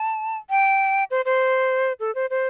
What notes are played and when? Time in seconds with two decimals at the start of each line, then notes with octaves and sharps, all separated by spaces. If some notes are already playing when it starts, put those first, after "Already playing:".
Already playing: A5
0.50 G5
1.11 C5
1.25 C5
2.00 A4
2.15 C5
2.30 C5